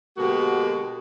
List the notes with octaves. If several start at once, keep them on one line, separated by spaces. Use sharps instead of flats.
B2 D3 G#3 A#3 F#4 G4